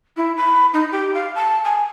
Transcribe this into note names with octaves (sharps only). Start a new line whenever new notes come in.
E4
B5
D#4
G4
F5
A5
G#5